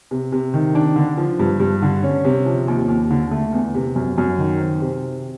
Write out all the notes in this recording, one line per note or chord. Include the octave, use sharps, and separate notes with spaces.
C3
C3
D#3
D4
D3
F3
G2
G2
D3
C#4
C3
F3
D#2
D#2
D3
A3
E2
C3
F#2
F#2
D#3
C4
C3